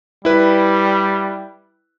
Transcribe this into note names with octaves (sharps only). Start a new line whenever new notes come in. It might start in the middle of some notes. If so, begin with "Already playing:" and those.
G3 E4 B4